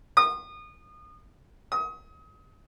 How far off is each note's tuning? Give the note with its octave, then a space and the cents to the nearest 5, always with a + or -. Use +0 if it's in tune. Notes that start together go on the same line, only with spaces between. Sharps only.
D#6 -30
D#6 +30